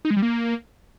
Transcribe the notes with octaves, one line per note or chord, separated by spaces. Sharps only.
D#4
G#3
G3
A#3